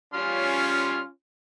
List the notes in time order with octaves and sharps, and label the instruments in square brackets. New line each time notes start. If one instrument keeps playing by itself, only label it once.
[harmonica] G3 C6 F6 [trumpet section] C#4 F4